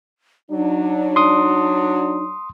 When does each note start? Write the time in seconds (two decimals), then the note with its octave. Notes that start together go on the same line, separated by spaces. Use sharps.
0.50 F#3 D4 D#4
1.16 C6 D#6